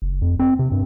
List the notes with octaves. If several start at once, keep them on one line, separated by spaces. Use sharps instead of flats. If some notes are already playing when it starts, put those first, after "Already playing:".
F#1
F2
C4
C3
G2